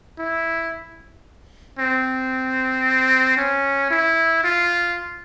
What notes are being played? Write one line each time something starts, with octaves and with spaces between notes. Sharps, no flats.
E4
C4
C#4
E4
F4